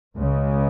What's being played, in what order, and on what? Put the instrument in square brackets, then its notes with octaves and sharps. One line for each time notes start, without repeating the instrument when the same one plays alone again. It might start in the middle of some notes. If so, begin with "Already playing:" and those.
[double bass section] C#2 C#3 G#3